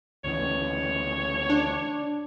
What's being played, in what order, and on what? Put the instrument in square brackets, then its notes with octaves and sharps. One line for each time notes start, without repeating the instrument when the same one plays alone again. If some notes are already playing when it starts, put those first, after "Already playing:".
[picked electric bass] D2 C#3 E3 [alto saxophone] C#5
[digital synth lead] D4